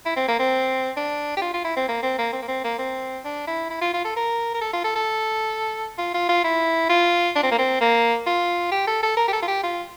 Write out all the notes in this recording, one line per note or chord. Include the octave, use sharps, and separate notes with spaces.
E4
C4
A#3
C4
D4
G4
F4
F4
E4
C4
A#3
C4
A#3
C4
A#3
C4
A#3
C4
D4
E4
E4
F4
F4
A4
A#4
A#4
A4
F4
A4
A4
F4
F4
F4
E4
F4
D4
C4
A#3
C4
A#3
F4
G4
A4
A4
A#4
G4
A4
F4
G4
F4